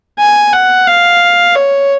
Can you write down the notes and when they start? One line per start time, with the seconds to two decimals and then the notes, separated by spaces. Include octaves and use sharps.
0.20 G#5
0.53 F#5
0.87 F5
1.55 C#5